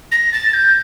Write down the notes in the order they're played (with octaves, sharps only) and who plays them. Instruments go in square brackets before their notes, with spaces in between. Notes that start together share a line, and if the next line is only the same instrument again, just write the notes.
[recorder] A#6
A6
G6